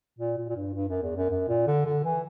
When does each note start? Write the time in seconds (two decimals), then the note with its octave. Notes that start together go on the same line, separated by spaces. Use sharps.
0.19 A#2
0.38 A#2
0.49 A#2
0.56 G2
0.74 G2
0.89 F#2
1.02 E2
1.16 F#2
1.30 F#2
1.48 A#2
1.67 D3
1.86 D3
2.04 E3